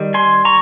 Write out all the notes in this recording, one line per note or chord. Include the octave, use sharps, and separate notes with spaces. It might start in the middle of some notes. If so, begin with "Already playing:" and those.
Already playing: D#3 G3
G#5 C6
A#5 C#6